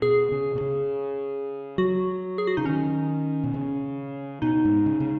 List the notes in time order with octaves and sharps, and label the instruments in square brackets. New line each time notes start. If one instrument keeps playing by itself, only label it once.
[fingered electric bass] B2 [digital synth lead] G#4
[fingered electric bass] C#3
B2
C#3
[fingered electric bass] F#3 [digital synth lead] F#4
[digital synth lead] G#4
F#4
[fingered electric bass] C#3 [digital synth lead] D#4
[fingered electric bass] D#3 [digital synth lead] C#4
[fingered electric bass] B2
C#3
[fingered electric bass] B2 [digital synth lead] D#4
[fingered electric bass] G#2
C#3
C#3